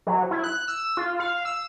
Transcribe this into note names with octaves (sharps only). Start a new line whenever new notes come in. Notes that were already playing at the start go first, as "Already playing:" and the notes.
F#3
E4
F#6
E6
F4
F5
E6